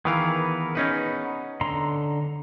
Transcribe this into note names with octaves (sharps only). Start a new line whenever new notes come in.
D#3 E3 B3 G#4 A#4 F5
C#4 D#4 B4
D3 A#5 C6